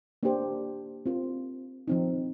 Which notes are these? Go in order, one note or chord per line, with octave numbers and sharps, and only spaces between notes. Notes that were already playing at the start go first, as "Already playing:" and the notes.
A#3 D4 G4 C5
C4 F4 A#4
F3 C4 D#4